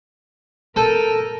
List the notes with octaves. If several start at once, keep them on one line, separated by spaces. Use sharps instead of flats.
A4 A#4 A5 G6 D#7